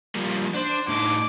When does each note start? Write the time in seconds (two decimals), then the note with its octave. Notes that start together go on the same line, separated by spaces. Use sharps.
0.15 F3 G3 A#3
0.54 D4 C5
0.88 A2 D4 D#4 D6